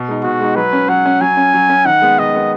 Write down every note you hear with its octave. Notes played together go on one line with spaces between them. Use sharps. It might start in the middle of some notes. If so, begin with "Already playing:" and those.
Already playing: B2
G#3 D#4
B2 F#4
G#3 D#4
F#3 B4
C#4
F#3 F#5
C#4
F#3 G#5
C#4
F#3
C#4
D#3 F#5
G#3 B3
D#3 D#5
G#3 B3